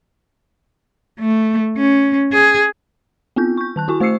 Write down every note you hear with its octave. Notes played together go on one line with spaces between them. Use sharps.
A3
C#4
G#4
B3 C4 F4 G6
C#6 G6
D#3 A5 F#6
E4 F#4 G#5 C#6
A3 C5 C#6 E6 C7 C#7